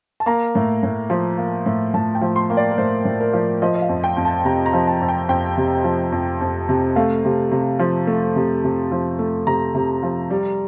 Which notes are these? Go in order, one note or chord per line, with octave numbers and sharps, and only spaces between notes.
A5
A#3 A#5
A2
A2
F3
A#3
A2
A2 A5
G5
F3
C6
A#3
D5
A#4
A2 C5
A2
A#4
F3
F3 D#5
D#5
F5
F2
G5
F2
A5
C3 A#5
A#5
F3
A5
F2
G5
F2 G5
C3
F3
F2
F2
C3
A3 F5
C3
C3
F3
A3
C3
C3
F3
A3
C3 A#5
C3
F3
G3